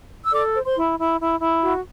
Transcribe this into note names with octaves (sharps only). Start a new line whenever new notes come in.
E6
A4 D5 D6
C5
C5 C6
E4
E4
E4
E4
F#4